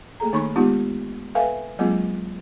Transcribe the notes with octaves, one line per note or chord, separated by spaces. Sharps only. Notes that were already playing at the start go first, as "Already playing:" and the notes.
A3 A#3 G#4 A4 A#5
D#3 A#3 D#4 B5 C#6
G#3 B3 D#4 F4 G4
A4 B4 E5 F5 G5 G#5
F#3 G#3 A#3 C4 F4 G#4